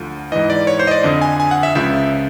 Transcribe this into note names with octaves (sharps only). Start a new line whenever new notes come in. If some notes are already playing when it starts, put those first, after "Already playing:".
Already playing: D2 D3 F3
G#2 E3 D#5
D5
C#5
C5
D#5
D5
F2 D3 F3 D#5
G#5
G#5
F#5
E5
C#2 C#3 F3 E5